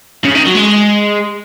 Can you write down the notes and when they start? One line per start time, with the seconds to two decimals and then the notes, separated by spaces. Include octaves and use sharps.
0.25 C#3
0.35 D#3
0.46 F#3
0.55 G#3